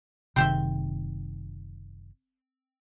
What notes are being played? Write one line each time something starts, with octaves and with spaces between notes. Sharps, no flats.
F#1 C3 D#3 C4 C5 E5